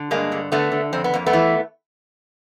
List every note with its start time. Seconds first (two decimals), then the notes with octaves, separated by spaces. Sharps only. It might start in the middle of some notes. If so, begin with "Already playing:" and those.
Already playing: D3
0.11 G2 G#3 A#3
0.32 D3
0.52 D3 A3 B3
0.72 D3
0.93 F2 C4
1.04 B3
1.14 F2 A#3
1.26 A3 B3
1.33 E3